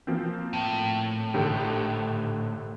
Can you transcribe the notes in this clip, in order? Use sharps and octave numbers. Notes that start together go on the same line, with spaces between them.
F3 A#3 C4
A2
G#1 D3 G4